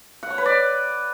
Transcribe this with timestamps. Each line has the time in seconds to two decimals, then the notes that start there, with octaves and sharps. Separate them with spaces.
0.23 F#5
0.30 C#5
0.38 B4
0.46 D5